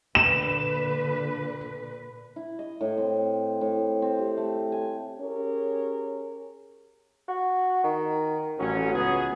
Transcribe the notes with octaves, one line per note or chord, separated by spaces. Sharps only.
A#2 D3 B4 E7
E4
D#5
A2
C4
A2
C4
G4
A3
G#5
C#4 G4 G#4 A#4 C#5
F#4
D#3
A1 F#3 C#4
C#2 B3 G#4